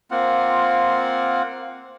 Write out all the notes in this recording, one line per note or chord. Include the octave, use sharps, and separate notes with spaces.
A#3 C4 F4 F#5